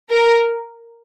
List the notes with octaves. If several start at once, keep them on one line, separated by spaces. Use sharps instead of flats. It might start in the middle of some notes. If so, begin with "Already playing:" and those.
A#4